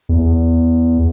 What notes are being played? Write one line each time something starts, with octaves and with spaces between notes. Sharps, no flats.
E2